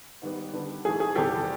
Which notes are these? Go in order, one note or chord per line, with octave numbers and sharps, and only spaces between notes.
G#2 D#3 G3 B3
D3 G3 B3
G#2 E3 A3 G#4
G#4
E2 C3 D#3 G3 G4 A4